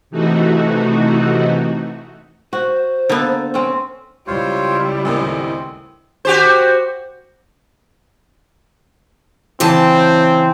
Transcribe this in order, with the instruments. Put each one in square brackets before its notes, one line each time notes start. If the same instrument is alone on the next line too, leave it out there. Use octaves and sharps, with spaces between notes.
[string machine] C3 E3 A3 D#4 F#4
[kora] F#4 [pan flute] C5
[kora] D3 A4 [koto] A#3 B3
[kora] C4 C#4
[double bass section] C#2 [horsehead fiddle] G3 E4 [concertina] F4 C5 C#5
[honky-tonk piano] D2 A2 D#3 [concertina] C4
[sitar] F#4 G4 C5
[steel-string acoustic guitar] C#3 E3 A5 [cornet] C4